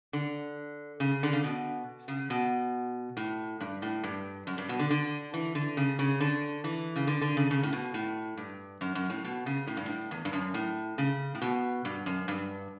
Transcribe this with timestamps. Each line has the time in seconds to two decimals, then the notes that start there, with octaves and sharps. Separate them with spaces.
0.13 D3
1.00 C#3
1.23 D3
1.33 C#3
1.44 B2
2.08 C#3
2.30 B2
3.17 A2
3.60 G2
3.82 A2
4.03 G2
4.47 F#2
4.58 G2
4.69 B2
4.79 D3
4.90 D3
5.34 E3
5.55 D3
5.77 C#3
5.99 C#3
6.20 D3
6.64 E3
6.96 C#3
7.07 D3
7.21 D3
7.37 C#3
7.51 C#3
7.63 A2
7.73 B2
7.94 A2
8.37 G2
8.81 F#2
8.95 F#2
9.10 A2
9.25 B2
9.46 C#3
9.67 A2
9.77 G2
9.86 A2
10.11 E2
10.25 G2
10.33 F#2
10.54 A2
10.98 C#3
11.35 A2
11.42 B2
11.85 G2
12.06 F#2
12.28 G2